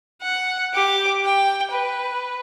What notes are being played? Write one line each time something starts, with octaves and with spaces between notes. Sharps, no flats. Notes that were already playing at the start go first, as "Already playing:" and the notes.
F#5
G4 D6
G5
B4